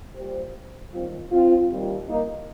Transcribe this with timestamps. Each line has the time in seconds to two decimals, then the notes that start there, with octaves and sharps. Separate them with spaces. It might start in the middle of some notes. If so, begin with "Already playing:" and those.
0.16 A#2 G3 G4 C5
0.92 D#2 D#3 G3 C4 F4
1.30 C4 F4
1.69 D#2 D#3 G3
2.07 A#3 D#4